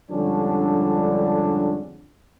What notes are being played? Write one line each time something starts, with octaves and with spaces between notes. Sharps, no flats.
F2 G#2 D3 G3 C#4 D4